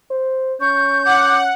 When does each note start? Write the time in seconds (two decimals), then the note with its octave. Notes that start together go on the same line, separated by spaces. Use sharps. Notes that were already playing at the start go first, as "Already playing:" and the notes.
0.11 C5
0.61 C#4 C#6 G6
1.05 F#5 D6